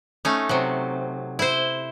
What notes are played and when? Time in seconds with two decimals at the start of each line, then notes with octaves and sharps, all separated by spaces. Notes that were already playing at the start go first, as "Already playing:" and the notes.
0.25 A3 C#4 D#4
0.49 C3 F#3
1.39 E4 C5